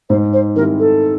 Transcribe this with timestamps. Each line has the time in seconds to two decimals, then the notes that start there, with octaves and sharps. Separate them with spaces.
0.10 G#2 C5
0.33 C5
0.56 D#3 G3 C4 E4 A#4
0.79 A4